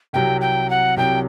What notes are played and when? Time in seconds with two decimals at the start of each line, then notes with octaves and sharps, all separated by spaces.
0.13 C2 C3 F#3 G5
0.41 G5
0.70 F#5
0.97 C2 C3 F#3 G5